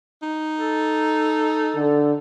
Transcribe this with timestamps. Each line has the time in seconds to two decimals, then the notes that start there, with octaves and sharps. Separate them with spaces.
0.22 D#4
0.59 A4
1.76 D3